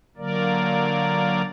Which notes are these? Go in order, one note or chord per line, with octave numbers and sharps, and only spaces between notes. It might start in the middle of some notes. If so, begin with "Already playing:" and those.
D3 F#3 A#3 A#4 D5